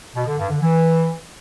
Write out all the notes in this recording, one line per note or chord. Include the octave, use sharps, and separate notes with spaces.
B2
D3
G2
D3
E3